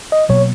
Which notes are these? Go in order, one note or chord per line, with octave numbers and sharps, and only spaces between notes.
D#5
B2 F#3 A#3 C#5